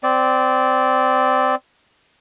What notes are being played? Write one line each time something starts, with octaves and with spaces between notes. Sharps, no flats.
C4 D5